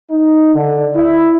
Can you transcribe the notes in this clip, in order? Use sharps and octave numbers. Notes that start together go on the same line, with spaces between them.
D#4
D3
E4